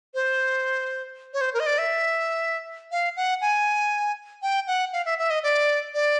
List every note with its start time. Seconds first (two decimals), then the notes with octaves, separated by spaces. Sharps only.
0.14 C5
1.34 C#5
1.41 C5
1.54 A#4
1.60 D#5
1.66 D5
1.78 E5
2.92 F5
3.17 F#5
3.41 G#5
4.42 G5
4.67 F#5
4.93 F5
5.06 E5
5.19 E5
5.30 D#5
5.43 D5
5.94 D5